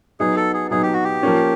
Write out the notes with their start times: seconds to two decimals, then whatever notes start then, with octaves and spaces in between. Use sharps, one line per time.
0.20 F#3 B3 D#4 G#4
0.36 A4
0.54 G#4
0.71 F#3 B3 D#4 G#4
0.83 G4
0.93 F#4
1.04 G4
1.23 F3 A#3 C#4